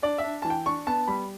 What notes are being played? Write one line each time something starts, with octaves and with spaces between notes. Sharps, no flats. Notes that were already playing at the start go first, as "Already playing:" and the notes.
D4 D5
E5
D4
E3 A5
G5
D4 C#6
B3 A5
G3 B5